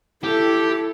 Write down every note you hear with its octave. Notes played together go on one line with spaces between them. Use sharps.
E4 G4 A4